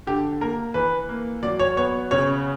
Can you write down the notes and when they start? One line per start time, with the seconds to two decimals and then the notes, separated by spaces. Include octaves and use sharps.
0.07 D3 G4
0.41 A#3 A#4
0.74 E3 B4
1.09 A#3
1.43 F#3 D5
1.59 C#5
1.77 B3 C#5
2.11 C#3 C#5